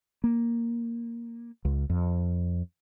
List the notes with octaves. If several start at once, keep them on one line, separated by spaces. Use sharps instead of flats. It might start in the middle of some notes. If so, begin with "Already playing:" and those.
A#3
C#2
F2